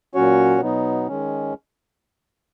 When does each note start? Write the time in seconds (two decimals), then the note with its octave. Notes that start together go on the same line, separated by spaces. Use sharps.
0.15 A#2 F#3 C#4 F#4 C#5
0.61 B2 F#3 B3 D#4
1.08 D#3 G#3 C#4